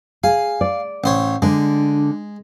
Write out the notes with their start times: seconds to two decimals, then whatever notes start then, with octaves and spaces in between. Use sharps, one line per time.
0.24 G#4 F5
0.61 D5
1.04 A1 C5 C#5
1.42 D3 G#3 D4